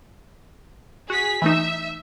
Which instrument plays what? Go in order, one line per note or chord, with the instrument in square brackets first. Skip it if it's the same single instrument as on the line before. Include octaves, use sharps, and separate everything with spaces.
[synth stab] F#4 [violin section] G#4 B6
[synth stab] E3 A3 D#4 [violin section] E5